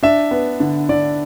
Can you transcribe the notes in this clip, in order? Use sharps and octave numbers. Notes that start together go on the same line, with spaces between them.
D4 E5
B3
D3
D3 D5